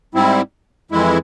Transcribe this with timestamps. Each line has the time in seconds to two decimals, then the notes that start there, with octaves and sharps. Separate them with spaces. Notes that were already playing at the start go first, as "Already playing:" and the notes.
0.14 G#2 G3 C4 E4
0.91 F2 E3 G#3 E4